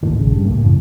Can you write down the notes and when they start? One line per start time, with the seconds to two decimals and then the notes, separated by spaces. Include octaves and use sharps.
0.03 D#2 A2 D#3
0.19 A#1 C#3
0.31 G2 G3
0.46 C#2 A2 A#3
0.63 F#2 C#3 E3 C4